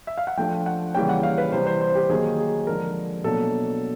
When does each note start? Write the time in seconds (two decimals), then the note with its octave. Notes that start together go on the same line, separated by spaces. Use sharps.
0.07 E5
0.18 F5
0.27 F#5
0.37 F3 A3 D4 F4 G5
0.66 F#5
0.94 C#3 E3 G3 A#3 C#4 G5
1.09 F#5
1.23 F5
1.38 B4
1.52 C3 E3 G3 C5
1.67 C5
1.81 C5
1.95 G4
2.10 D#3 F#3 A#3 D#4 G#4
2.38 G#4
2.67 D3 F3 G#3 A#4
3.24 B2 F#3 A#3 D4 A4